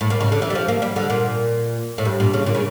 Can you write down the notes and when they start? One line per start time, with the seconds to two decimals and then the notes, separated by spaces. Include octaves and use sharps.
0.01 A2
0.10 A#2
0.21 C#3
0.32 D3
0.42 E3
0.50 G3
0.55 F3
0.68 A#3
0.82 G3
0.96 D3
1.10 A#2
1.98 A2
2.05 G2
2.20 A#2
2.33 C#3
2.46 A#2
2.55 C#3